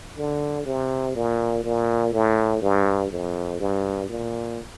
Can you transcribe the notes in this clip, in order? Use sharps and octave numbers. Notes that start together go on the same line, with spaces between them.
D3
C3
A#2
A#2
A2
G2
F2
G2
A#2